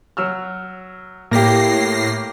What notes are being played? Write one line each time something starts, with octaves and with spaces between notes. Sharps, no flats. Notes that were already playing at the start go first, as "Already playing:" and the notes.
F#3 E6 F6
A2 A#3 G4 A#6 C7